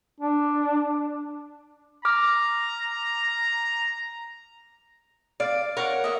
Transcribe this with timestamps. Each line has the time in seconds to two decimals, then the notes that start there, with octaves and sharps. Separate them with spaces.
0.21 D4
2.05 A#5 D6 F6
5.40 D5 F5
5.77 A#4 C#5 F5 F#5
6.04 D#5 E5